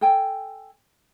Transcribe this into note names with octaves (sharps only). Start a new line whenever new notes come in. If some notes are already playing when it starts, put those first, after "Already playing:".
A4 G5 G#5